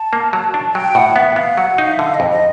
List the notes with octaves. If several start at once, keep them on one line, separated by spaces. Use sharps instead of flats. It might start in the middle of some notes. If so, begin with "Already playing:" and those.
Already playing: A5
A#3
F#3
D4
F#3 G5
A2 F#5
B3 E5
B3 F5
F#3 F#5
D#4 F5
E5
D3 F5
D#5
F2
D#5